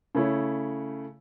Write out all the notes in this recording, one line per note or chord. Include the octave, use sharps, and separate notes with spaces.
C#3 A3 E4 C#5